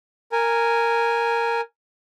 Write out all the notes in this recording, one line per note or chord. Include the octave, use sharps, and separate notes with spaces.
A#4 G#5